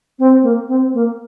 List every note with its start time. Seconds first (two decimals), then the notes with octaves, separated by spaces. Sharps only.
0.19 C4
0.43 A#3
0.68 C4
0.94 A#3